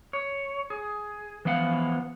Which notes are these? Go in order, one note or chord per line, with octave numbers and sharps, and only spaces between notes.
C#5
G#4
E3 F3 B3 F5 F#5